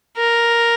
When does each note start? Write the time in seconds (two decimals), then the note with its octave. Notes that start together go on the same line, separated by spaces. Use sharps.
0.17 A#4